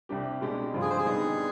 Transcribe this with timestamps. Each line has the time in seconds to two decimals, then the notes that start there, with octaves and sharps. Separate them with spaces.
0.09 C2 C3 G3 D4 G4
0.41 B2 G#3 D4 G4
0.74 G2 D3 F3 C4 F4
0.82 G#4
0.90 C5
0.98 G#4
1.05 D3 G3 B3 D#4